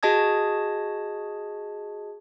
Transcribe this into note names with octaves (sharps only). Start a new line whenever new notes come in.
F#4 G#4 D#5 A5 D#6 G#6